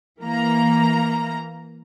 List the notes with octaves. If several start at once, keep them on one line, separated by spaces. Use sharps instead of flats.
E3 A#3 A#5